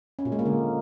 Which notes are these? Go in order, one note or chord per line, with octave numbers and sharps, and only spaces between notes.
C#4
A#2
G#3
A#3
D3